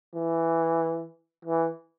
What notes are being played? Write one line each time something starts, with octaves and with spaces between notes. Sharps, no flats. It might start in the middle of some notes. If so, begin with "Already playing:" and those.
E3
E3